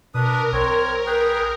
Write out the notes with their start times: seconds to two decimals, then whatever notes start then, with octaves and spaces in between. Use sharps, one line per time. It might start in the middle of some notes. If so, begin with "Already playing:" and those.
0.14 B2 D4 A#4 B4 D#6
0.53 B1 C4 C#5
1.06 G#4 B4 G5